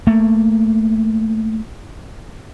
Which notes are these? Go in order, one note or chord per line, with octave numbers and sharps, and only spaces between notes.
A3 A#3